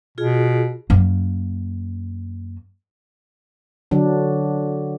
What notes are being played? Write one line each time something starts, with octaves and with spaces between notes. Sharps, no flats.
B2 F4 G#4
F#2 A#3
D3 F#3 D4